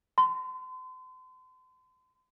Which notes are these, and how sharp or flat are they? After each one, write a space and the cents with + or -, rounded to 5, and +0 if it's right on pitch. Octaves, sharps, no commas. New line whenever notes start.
C6 -40